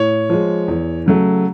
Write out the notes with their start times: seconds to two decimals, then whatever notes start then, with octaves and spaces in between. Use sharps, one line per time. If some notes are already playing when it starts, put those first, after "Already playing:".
Already playing: A2 C#5
0.30 F3 G#3
0.68 E2
1.06 C#3 F#3 A3